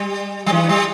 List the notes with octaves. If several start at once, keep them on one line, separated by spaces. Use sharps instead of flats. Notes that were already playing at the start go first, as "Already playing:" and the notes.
Already playing: G3
G3
E3
G3